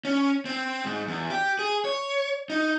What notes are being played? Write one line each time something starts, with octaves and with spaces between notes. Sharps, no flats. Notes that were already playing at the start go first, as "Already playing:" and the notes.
C#4
C4
G#2
E2
G4
G#4
C#5
D#4